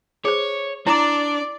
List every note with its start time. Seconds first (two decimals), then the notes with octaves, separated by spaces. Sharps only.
0.25 G#4 C5 C#5
0.87 D4 E4 D5 A#5 D6